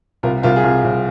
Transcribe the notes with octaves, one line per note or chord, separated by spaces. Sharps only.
C2 F4 A#4
C2 F4 A#4
G#4
C2 F4
C2